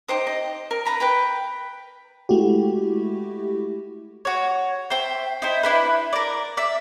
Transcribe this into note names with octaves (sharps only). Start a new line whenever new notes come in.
D#4 G4 C5 D#6
D#5
A#4
B4 A#5 B5
B4 G5 B5
G#3 A3 E4 F#4 G4
F#4 C#5
C5 E5 G5
D#4 E4 C5
D4 E4 B4
A#4 D5
D5 E5